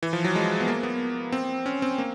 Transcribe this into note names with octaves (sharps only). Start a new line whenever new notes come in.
E3
F3
F#3
G#3
B3
A#3
B3
C4
C#4
C4
A#3